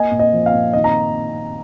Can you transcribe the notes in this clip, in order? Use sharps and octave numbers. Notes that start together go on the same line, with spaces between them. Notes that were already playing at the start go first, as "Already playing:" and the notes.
Already playing: A#3 D#5 G#5
A#2
D#5
F3
F5
A#2
D#3 D#5
A#5